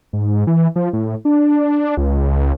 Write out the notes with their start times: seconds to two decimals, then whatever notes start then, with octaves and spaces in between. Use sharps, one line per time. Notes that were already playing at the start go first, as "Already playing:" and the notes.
0.13 G#2
0.47 E3
0.76 F3
0.93 A2
1.25 D4
1.97 C#2
2.32 C#2